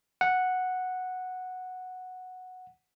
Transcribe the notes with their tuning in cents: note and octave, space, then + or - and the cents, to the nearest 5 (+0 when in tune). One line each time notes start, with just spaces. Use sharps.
F#5 -5